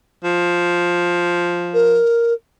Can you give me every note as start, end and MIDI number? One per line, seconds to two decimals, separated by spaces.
0.24 1.99 53
1.74 2.33 70